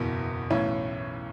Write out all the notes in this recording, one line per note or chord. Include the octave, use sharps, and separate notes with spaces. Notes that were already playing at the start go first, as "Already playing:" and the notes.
Already playing: F#1 E2 B2
B1 A2 E3 C#4